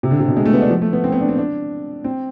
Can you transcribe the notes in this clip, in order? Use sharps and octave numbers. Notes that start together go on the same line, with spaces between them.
C3
D3
C3
B2
G#3
A3
B3
D4
F3
A3
B3
C4
B3
D4
C4
D4
C4